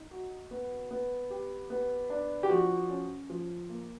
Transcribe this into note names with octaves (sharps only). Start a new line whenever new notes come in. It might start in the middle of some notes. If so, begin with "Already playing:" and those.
Already playing: D#4
F#4
B3
B3
G4
B3
D4
G4
F3 F#4
C#4
F3
A#3